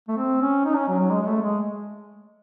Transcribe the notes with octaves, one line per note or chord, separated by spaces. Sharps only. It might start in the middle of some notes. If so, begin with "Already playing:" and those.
A3
C4
C#4
D#4
C#4
F#3
F#3
G#3
G#3
A3
G#3